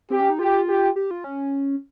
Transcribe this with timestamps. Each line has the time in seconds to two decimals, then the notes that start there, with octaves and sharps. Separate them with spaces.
0.10 C4 G4
0.20 C#4
0.30 D#4
0.39 F4 G4
0.68 G4
0.96 G4
1.11 F4
1.24 C#4